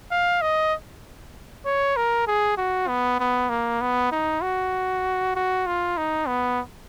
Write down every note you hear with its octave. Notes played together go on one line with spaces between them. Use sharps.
F5
D#5
C#5
A#4
G#4
F#4
B3
B3
A#3
B3
D#4
F#4
F#4
F4
D#4
B3